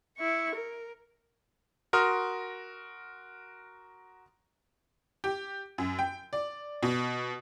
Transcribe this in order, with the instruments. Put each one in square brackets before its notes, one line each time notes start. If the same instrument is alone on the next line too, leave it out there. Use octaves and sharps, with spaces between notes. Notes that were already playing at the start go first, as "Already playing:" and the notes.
[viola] E4 C#6
A#4
[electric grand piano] F#4 A#4 C6 D#6 F6
[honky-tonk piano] G4
F#2
G5
D5
B2